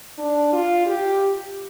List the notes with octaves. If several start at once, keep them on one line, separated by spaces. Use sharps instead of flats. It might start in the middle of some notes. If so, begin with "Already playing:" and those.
D4
F4
G4